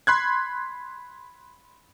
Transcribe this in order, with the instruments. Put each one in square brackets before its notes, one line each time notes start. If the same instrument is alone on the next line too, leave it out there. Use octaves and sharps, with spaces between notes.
[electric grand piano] B5 C6 F#6 G#6